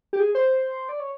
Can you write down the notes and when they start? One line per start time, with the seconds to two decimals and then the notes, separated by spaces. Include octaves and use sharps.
0.13 G4
0.20 G#4
0.35 C5
0.89 D5
1.00 C#5